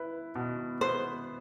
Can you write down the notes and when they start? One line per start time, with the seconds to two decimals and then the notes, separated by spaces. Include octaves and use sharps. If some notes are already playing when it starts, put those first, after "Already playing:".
Already playing: E4 B4
0.35 B2
0.81 B3 C5